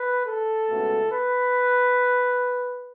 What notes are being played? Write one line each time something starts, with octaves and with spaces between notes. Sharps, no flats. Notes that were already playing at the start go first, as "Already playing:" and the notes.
Already playing: B4
A4
C#2 B2 A3
B4